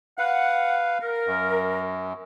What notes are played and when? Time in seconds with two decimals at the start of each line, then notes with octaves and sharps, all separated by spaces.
0.18 B4 F5 F#5
1.02 A#4
1.27 F#2